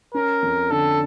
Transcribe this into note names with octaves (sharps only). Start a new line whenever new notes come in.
C#4 A#4
F2
D3 A4